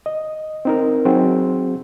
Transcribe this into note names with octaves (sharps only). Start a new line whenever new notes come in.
D#5
C4 D#4 A#4
F#3 C4 F#4 G#4